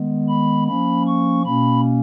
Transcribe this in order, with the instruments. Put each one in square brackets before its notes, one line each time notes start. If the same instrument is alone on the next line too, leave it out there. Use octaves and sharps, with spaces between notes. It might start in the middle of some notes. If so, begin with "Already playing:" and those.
Already playing: [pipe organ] D#3 G#3 B3
B5
F3 A#3 C#4 B5
C#6
B2 A#3 C#4 B5